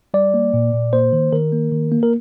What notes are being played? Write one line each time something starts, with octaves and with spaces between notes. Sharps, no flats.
G3 D5
A#3
A#2
A#2
A#3 C5
D#3
D#3 A#4
A#3
D#3
A#3
A#4